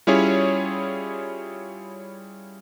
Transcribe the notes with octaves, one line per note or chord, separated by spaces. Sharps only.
G3 C#4 E4 F4 G#4 C#5